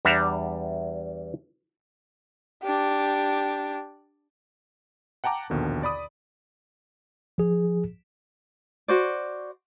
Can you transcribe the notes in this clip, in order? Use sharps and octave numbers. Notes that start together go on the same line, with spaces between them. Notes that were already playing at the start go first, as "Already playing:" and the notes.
E2 G3 D4 E5 F#5 A#5
D4 G4
F#5 G5 A5 A#5 D6
A#1 D#2 B2 D3 D#3
D5 B5 D#6
F3 G#4
F#4 C5 D5